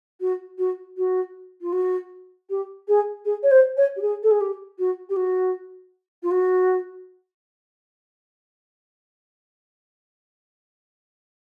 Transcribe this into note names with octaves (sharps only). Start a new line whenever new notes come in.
F#4
F#4
F#4
F4
F#4
G4
G#4
G#4
C#5
C5
C#5
G4
G#4
A4
G#4
G4
F#4
G4
F#4
F4
F#4